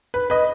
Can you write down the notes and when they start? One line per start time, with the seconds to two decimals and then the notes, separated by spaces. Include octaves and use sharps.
0.14 B4
0.30 B4 D#5